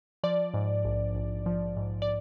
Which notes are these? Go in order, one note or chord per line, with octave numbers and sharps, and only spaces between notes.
F3 D5
G#2
A#1
A#1
F3
G#2
D5